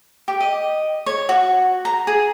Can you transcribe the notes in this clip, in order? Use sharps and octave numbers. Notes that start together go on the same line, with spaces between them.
G4
D#5
C#5
F#4
A#5
G#4